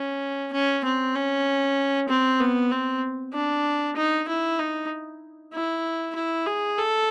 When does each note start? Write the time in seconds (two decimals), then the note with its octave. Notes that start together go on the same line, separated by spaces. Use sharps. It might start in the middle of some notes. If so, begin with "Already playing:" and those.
Already playing: C#4
0.53 C#4
0.84 C4
1.15 C#4
2.09 C4
2.40 B3
2.71 C4
3.33 D4
3.96 D#4
4.28 E4
4.59 D#4
5.53 E4
6.15 E4
6.46 G#4
6.78 A4